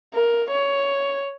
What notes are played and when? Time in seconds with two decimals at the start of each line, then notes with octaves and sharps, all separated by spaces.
0.14 A#4
0.51 C#5